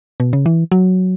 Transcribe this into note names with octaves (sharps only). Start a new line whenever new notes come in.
B2
C#3
E3
F#3